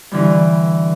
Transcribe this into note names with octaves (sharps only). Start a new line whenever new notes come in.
G2 D3 E3